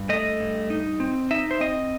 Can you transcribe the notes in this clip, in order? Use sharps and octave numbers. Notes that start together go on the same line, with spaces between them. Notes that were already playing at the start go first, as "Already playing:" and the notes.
Already playing: G2
A3 D#5
G2
D#4
C4
D#4 E5
C5
C4 D#5